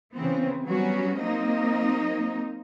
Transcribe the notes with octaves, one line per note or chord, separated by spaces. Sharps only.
C#3 E3 B3 C4
F#3 G3 B3 C#4 F#4
F#3 A#3 C4 D#4 D#5